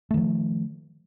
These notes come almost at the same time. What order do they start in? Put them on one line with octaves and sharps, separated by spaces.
A3 D#3 F3